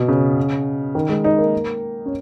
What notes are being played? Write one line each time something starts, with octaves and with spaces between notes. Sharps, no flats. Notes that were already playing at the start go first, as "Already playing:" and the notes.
Already playing: B2
C#3
D#3
G#3
D#4
A#3
C#4